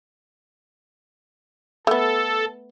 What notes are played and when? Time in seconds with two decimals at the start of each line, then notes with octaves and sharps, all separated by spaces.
1.87 A3 B3 A4